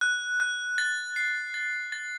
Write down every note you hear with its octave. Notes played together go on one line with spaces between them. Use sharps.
F#6
F#6
A6
C7
A6
A6